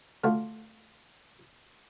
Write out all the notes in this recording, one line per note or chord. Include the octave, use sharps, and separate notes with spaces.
D3 A3 F4 F#4